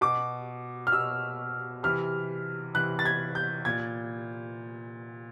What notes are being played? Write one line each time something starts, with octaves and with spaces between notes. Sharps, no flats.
B2 D6
F6
B2 E6
C3 E3 F6
C3 E3 F#6
A6
G#6
G6
A#2 G#6